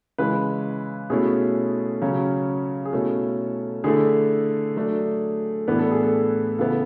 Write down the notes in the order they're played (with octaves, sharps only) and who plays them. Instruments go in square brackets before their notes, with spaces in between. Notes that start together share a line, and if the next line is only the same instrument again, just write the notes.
[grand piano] C#3 E3 G#3 B4
B2 A3 C#4 E4 G#4
C#3 F#3 C#4
G#4
B2 A3 C#4 E4 A4
D3 A3 E4 G#4
F#3 A3 D4
A2 E3 B3 D4 B4
A4
G#4
A4
C#3 E3 B3 E4 A4